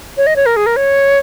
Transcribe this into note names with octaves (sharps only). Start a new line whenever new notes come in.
C#5
D#5
C#5
A#4
G#4
A#4
C#5